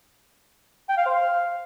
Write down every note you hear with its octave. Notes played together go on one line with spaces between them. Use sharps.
G5
F5
C5
F5